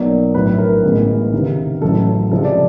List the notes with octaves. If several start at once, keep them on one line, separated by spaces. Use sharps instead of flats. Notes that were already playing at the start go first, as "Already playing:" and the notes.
Already playing: B1 B2 F#3 A#3 D5
A#1 A2 F#3 B4
A#4
A1 A2 E3 G#3 B3
C#2 C3 D#3
A1 A2 F#3 A4
C#2 C3 F3 G#3 A4
D5